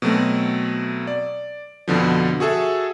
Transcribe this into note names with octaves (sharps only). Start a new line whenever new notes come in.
B2 F#3 A3 C4
D5
F2 B2 D3 F3
F#4 G#4 A4 E5